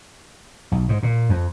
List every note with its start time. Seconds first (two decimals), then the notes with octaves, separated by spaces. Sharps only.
0.72 B1
0.89 G#2
1.03 A#2
1.29 F2